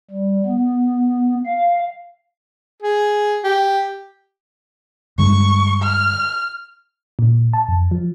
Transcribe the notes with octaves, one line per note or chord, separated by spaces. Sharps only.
G3
B3
F5
G#4
G4
G2 D3 G#3 C#6
F6
A#2
A5
F2
F3